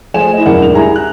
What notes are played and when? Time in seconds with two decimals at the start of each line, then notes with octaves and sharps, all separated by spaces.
0.14 F3 A3 G#4 C5 G#5 E7
0.34 E4 D#5
0.46 E1 F#2 E4 A#4 D5 F#5
0.62 G#1 D2 F7
0.74 G3 E4 G#4 G#5 A#5
0.96 F#6